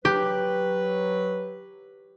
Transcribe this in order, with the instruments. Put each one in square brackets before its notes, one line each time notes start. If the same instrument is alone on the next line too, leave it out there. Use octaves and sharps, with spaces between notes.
[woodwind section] F#3 B4 [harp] G4